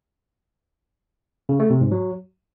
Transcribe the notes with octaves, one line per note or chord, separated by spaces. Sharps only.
C#3
A3
C3
G#2
F#3